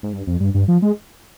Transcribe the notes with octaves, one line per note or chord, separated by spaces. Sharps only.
G#2
G2
F2
G2
G2
F3
G#3